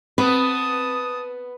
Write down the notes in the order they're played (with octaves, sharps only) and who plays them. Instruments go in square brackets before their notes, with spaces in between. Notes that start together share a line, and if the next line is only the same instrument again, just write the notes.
[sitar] B3 [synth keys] C4 [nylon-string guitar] B4 [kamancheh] A5 D#6